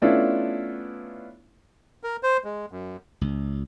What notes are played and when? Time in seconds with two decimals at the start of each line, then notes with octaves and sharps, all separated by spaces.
0.02 A3 B3 C#4 D4 E4 F4
2.03 A#4
2.23 C5
2.44 G#3
2.72 F#2
3.21 C#2